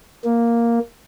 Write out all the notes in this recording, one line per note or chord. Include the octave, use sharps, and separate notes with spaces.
A#3